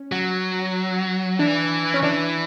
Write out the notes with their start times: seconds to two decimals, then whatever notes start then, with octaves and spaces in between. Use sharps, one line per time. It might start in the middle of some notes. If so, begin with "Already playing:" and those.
Already playing: C#4
0.12 F#3
1.39 E3 D4
1.94 C#4
2.03 E3 D4